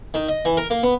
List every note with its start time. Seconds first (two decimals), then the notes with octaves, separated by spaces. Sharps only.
0.14 D#3
0.29 D#5
0.45 E3
0.57 A#4
0.70 A#3
0.83 B3